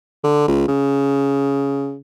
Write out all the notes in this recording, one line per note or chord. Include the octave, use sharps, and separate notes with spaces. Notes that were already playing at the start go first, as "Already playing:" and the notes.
D3
C#2
C#3